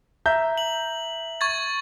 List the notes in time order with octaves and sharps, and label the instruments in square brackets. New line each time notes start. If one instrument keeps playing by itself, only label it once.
[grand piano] E5 A#5 G6
[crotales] F#7
C#6 G#6 A6